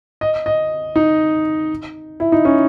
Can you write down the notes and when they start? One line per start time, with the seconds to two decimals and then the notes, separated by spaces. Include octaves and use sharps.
0.21 D#5
0.46 D#5
0.96 D#4
2.20 E4
2.32 D#4
2.45 C#4